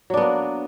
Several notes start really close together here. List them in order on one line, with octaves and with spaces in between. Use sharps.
F#3 D4 B3 A#3